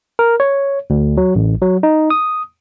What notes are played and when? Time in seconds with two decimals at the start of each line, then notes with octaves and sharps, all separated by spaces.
0.19 A#4
0.40 C#5
0.90 D2
1.17 F#3
1.35 A1
1.62 F#3
1.83 D#4
2.10 D#6